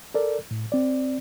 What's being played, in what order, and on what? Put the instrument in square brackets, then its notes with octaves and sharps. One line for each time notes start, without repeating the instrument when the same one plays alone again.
[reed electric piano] A4 A#4 D5
A2
C4 D5